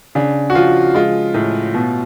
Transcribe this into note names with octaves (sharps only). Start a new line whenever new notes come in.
C#3 D4
F#4
F3 F4
G#3 F4
A2
B2